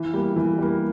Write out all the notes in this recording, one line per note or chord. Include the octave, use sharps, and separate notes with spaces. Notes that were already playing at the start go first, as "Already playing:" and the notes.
Already playing: E3
G3 A#3
E3
G3 A#3